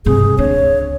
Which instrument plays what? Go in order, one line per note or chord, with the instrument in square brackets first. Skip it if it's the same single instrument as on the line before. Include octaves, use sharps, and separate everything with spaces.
[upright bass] G2 C3 [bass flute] G#4
[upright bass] C#2 D4 [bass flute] C#5